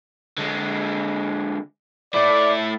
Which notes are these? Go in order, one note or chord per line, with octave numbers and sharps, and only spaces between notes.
D3 G#3
A3 E4 D5